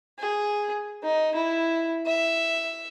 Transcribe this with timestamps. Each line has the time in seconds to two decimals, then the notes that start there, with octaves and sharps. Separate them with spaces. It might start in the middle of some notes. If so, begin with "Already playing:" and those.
0.19 G#4
1.03 D#4
1.35 E4
2.06 E5